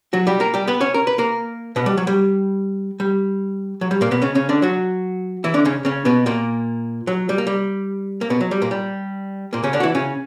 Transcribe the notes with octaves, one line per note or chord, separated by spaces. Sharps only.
F#3 F#4
G3 G4
A#3 A#4
G3 G4
B3 B4
C#4 C#5
A#4
B4
A#3 A#4
B2 B3
G3
F#3
G3
G3
F#3
G3
A#2 A#3
B2 B3
C#3 C#4
C#3 C#4
D3 D4
F#3 F#4
E3 E4
D3 D4
C#3 C#4
C#3 C#4
B2 B3
A#2 A#3
F#3
G3
A#3
G3
A#3
B2 B3
F#3
G3
A#2 A#3
G3
A#2 A#3
C#3 C#4
D3 D4
F#4
E3 E4
C#3 C#4